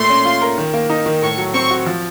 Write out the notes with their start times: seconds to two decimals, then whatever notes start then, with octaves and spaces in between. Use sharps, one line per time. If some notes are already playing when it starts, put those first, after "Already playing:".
Already playing: A#2 A3 C6
0.10 C#4
0.25 F4
0.42 A#4
0.58 D#3
0.74 A#3
0.90 D#4
1.06 D#3
1.22 A2 C#6
1.38 F#3
1.54 C4 C#6
1.71 F#4
1.86 F3